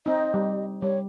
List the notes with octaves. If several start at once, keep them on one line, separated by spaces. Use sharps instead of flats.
C4 D#4 D#5
G3
G3 C#5